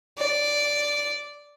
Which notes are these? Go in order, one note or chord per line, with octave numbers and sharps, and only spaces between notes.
D5